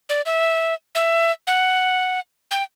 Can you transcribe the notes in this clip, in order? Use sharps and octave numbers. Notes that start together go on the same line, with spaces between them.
D5
E5
E5
F#5
G5